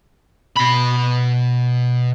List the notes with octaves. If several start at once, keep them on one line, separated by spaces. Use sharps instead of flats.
B2 B5